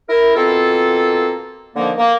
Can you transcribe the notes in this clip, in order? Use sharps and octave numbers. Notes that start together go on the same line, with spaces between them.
E4 A#4
B2 A#3 C4 F4 A4
D3 D#3 F3 A#3
A#3